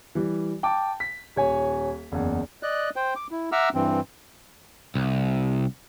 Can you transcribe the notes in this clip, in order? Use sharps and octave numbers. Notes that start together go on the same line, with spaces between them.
E3 G3
G5 A5 D6
B6
D#1 C#5 G#5
F#1 E2
D5 D#5 F#6
C5 G5
D6
E4
E5 F#5 A#5 D6 E6 F6
G2 E3 C4
C2